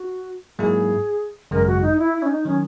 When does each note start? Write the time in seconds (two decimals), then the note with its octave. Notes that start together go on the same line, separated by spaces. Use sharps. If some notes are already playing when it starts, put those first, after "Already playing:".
Already playing: F#4
0.59 G#2 F#3 A#3 E4 G#4
1.51 G#1 F#2 C#3 G#3 A#4
1.67 F#4
1.82 D#4
1.98 E4
2.14 E4
2.22 C#4
2.30 D#4
2.45 D#3 F#3 C#4